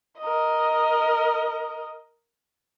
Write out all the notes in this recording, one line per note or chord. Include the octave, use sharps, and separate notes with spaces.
A#4 D#5